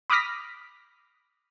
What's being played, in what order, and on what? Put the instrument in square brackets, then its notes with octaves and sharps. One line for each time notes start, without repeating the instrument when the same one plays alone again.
[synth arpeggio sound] B5 D6 D#6 F6 A#6 B6